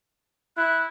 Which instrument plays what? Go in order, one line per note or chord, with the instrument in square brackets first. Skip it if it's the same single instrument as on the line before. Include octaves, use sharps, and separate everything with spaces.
[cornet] E4 [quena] F#6